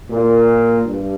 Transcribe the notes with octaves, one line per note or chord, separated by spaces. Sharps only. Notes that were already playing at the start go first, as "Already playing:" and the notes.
A#2
G2